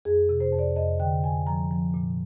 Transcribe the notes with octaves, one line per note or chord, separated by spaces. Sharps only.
F2 G#4
C3
C5
F2
D5
F2 D#5
D3 G5
F2 G#5
F3 A#5
F3
A#2